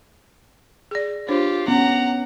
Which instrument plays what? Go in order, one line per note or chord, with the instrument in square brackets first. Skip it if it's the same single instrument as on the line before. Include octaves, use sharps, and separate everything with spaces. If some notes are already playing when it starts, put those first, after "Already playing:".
[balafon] G#4 D5
[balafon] D4 C5 C#5 [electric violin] F4 G4
[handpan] B3 C#4 [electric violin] F#5 A#5